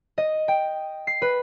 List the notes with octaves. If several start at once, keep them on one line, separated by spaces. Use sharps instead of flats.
D#5
G5
C7
B4